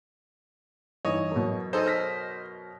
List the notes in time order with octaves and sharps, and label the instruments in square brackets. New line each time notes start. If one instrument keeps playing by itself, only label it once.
[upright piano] G2 E3 D#4 [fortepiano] C#5 D#5
[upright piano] F#2 B2
[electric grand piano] D#4 G#4 A4 [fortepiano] C5 D#5
[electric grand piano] F6 A#6 B6